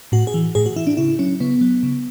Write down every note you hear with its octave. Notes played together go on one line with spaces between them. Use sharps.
A2 F#4
G#4
E3
A2 G#4
F#4
E3 E4
D4
C#3 E4
F#3 C#4
C#3 B3
F#3
C#3